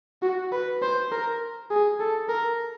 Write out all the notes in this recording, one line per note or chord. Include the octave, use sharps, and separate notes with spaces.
F#4
B4
C5
A#4
G#4
A4
A#4